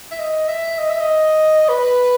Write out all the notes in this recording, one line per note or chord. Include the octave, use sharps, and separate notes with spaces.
E5
D#5
E5
D#5
E5
D#5
B4